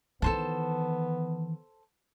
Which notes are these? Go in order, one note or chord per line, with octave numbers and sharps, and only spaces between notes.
D#3 E3 B3 A4 C5 A5